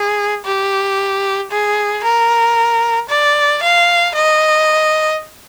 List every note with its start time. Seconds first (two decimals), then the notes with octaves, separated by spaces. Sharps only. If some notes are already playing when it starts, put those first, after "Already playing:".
Already playing: G#4
0.45 G4
1.51 G#4
2.03 A#4
3.09 D5
3.62 F5
4.15 D#5